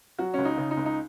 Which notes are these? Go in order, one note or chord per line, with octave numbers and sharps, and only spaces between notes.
F#3 F#4
C#2 C#4
D#4
C#3
D#4
C#2
D#4